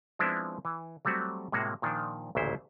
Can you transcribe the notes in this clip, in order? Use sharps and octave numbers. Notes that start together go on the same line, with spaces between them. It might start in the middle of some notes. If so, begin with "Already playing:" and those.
F3 G#3 B3 C4 D4 E4
E3
F#3 G3 A3 C4 F#4
A2 C3 G#3 A#3 F#4
A#2 D#3 F3 D4
A1 D2 A#2 C#3 E4 C5